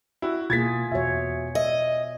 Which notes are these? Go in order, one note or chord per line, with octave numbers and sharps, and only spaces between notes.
E4 F#4
B2 A#3 F4 G#4 G#6 A6 B6
E2 B2 F#4 C#5 E5
D#5 E5